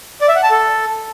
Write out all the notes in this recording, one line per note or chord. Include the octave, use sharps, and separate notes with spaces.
D5
E5
F#5
A5
A4